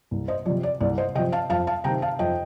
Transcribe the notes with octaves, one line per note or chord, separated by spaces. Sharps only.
C2
C5 D#5
C3 F3 D5
D5
C2 D5
C5 D#5
C3 F3 D#5 G5
F5 A5
F2 F5 A5
F5 A5
C3 D#3 G5 A#5
F5 A5
F2 D#5 G5